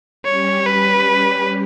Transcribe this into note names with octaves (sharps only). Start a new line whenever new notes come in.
G3 C#4 G4 C#5
B4